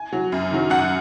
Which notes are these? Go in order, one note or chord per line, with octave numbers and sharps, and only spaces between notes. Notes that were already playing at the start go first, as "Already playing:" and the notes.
Already playing: G#5
F#3
F#2
D#3 F#3
F#2 F#5